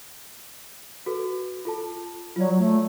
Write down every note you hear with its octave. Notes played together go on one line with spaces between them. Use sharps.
F#4 A4 B4
F4 A4 A5
F#3 F4 D5
A3